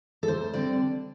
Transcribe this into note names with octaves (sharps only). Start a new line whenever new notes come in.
A4
D2 C5
D3 G3 C4 D5